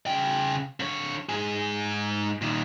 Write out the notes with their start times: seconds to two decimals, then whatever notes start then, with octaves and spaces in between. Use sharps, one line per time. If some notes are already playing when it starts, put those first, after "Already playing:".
0.06 C#3 G5
0.80 D3 C#5
1.29 G#2 G#4
2.42 A#2 D#3